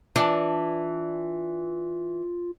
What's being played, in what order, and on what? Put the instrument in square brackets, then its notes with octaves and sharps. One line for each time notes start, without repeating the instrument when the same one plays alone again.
[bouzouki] E3 [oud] D4 [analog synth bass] F4